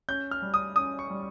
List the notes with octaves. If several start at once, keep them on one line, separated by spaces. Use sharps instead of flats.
C#4 G6
F6
G3
D#6
C#4 D#6
C#6
G3